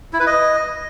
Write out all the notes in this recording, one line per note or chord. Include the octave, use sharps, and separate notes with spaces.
E4
B4
D#5